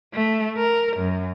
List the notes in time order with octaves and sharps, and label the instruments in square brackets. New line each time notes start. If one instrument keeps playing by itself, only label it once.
[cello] A3
A#4
F#2